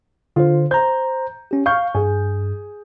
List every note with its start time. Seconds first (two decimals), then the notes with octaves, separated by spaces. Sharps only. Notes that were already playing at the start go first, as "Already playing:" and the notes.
0.36 D3 F4 C5
0.71 C5 A#5 G6
1.51 C#4 G4
1.66 F5 C#6 F6 G6
1.95 G2 G#4